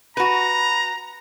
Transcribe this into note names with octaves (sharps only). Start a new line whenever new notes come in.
F#4 B4 A#5